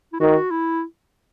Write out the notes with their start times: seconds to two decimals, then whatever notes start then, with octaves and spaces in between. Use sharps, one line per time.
0.13 E4
0.20 D#3 F#4
0.51 E4